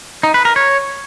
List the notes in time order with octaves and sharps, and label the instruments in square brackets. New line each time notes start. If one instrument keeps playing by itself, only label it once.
[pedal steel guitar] D#4
B4
A#4
C#5